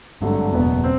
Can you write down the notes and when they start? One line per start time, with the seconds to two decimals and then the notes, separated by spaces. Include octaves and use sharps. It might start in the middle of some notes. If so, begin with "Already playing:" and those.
0.21 G#1 G2 D3 F#3 A3
0.52 F#1 E2 B2 F#3 B3
0.84 C4